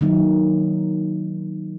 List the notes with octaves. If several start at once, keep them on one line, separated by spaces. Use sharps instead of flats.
D#3 F#3 A#3 D#4